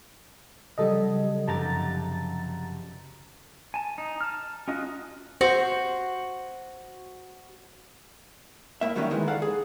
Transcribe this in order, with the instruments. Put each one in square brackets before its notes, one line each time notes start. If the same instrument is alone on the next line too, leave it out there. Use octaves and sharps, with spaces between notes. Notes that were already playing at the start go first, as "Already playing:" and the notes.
[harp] C#3 F#3 [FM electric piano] G3 A4 D#5
[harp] F1 F#2 G4 [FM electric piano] A5 A#5 A6
[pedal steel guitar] G#5 A5
D#4
A5 F6
C#4 D#4 F4 F#4 D#5
[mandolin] F#4 [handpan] C5
[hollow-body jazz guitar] A2 A#3 E5
D#3 F#3 G3 A#3 C#4
D#3 E3 G#3
A4 D5 F5 F#5
G#4